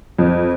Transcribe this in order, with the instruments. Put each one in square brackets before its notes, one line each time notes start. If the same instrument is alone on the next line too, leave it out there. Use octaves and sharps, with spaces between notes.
[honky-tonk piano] F2